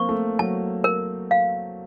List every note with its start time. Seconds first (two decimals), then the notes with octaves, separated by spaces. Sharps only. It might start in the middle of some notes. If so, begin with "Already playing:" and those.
Already playing: A#3 C4 C#6
0.09 A3
0.39 F#3 A5
0.84 A#4
1.31 F5